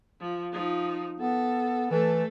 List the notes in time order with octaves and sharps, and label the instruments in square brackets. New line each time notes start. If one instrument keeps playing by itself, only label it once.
[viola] F3
F3 D#4
[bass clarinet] B3 [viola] A4
[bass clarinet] E3 [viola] A3 A4